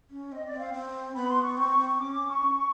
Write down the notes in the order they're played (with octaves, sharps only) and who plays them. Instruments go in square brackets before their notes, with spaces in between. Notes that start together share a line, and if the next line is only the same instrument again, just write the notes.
[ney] C#4
[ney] C4 [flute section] D#5
[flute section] D5
[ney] C4
[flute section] F5
[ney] C4
[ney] B3 [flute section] B5
[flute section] C6
C#6
[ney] C4 [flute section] C#6
[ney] C4
[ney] C#4 [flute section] D6
[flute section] D6
C#6
[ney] D4
C#4